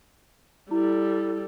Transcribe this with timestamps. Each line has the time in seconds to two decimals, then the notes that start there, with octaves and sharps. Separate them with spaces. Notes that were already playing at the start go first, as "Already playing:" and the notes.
0.71 G3 E4 A4